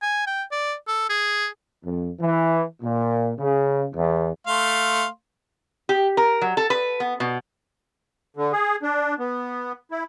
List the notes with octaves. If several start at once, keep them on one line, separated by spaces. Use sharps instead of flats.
G#5
G5
D5
A4
G#4
F2
E3
A#2
C#3
E2
A3 F5 C6
G4
A#4
F#3
A4
B4
B3
B2
D3
G#4
D4
B3
E4